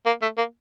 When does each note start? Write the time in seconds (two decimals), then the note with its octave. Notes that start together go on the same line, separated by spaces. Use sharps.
0.06 A#3
0.22 A3
0.38 A#3